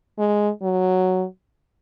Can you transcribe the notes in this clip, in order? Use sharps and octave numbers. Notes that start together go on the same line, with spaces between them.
G#3
F#3